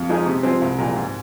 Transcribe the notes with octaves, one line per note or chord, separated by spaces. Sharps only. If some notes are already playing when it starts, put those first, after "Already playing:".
Already playing: F2
F3 G#3 D#4 G#4
C3
F3 G#3 C4
C2
A#2 F3 G#3
G#2